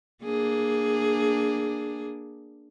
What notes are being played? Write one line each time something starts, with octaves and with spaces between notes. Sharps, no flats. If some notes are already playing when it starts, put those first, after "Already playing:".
A#3 D4 G#4